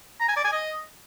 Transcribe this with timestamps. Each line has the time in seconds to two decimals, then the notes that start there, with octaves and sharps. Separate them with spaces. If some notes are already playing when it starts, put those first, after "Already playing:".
0.20 A#5
0.28 G#5
0.36 D5
0.44 G#5
0.52 D#5